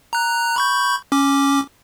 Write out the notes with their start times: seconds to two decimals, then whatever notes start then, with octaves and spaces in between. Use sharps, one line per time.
0.13 A#5 F#6
0.56 B5 C#6 G6
1.12 C#4 D6